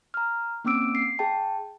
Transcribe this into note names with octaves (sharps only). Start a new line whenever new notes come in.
A#5 F6
A#3 C4 C#4 D6 E6 D7
C7
G#4 G5 A5